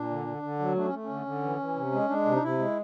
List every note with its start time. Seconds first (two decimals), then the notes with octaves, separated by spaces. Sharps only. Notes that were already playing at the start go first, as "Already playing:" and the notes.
Already playing: A#2 D4
0.10 D3
0.27 D3
0.42 D3
0.59 F#3
0.75 A3 D4
0.85 C#4
0.92 A3
1.04 C#4
1.09 D3
1.26 D3
1.43 E3
1.59 E3
1.75 C3
1.92 G#3
2.09 G#3 D4
2.25 C3
2.32 D#4
2.42 C3 E4
2.59 G#3